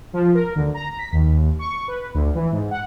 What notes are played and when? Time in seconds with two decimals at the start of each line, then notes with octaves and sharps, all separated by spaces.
0.13 F3
0.34 A#4
0.56 D2
0.74 A#5
0.99 B6
1.13 D#2
1.59 C#6
1.88 B4
2.14 D2
2.35 E3
2.52 G#2
2.71 F#5